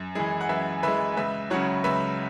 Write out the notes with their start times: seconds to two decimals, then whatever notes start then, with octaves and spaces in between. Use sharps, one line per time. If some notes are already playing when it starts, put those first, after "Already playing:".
Already playing: F#2
0.15 E3 G#3 E4 G#4
0.41 F#5
0.49 F#2 B4 E5
0.83 E3 G#3 B4 E5
1.17 C#2 B4 E5
1.50 C#3 F#3 C#5 F#5
1.84 C#2 B4 E5